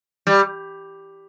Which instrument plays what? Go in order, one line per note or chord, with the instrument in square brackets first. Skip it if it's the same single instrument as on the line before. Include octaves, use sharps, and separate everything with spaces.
[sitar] G3